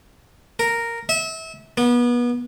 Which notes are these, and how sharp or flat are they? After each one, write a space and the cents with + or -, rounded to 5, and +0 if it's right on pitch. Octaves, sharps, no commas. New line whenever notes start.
A#4 -5
E5 -30
B3 -30